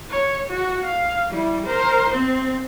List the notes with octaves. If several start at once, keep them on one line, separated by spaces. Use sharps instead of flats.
C#5
F#4
F5
G3 E4
A#4 C5
C4